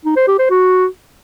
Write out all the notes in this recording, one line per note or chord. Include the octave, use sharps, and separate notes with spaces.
D#4
C5
G4
C5
F#4